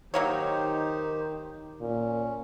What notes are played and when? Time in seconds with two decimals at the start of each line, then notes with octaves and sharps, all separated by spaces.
0.14 D#3 F#3 A#3 D#4 G4 C5 C#5
1.81 A#2 C#4